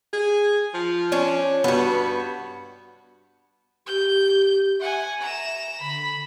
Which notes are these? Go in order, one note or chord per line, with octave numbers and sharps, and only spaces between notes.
G#4
F3
C#4 D4
G2 B3 F#4
G4 G6
E5 F#5 G#5
A#5 E7
D3 B5